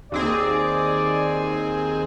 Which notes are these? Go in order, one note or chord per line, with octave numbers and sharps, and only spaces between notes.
D#2 C4 G#4 D5